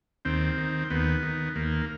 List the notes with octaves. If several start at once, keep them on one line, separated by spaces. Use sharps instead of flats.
D#2 C4
D#3
D#2 B3
D#3
D#2 A#3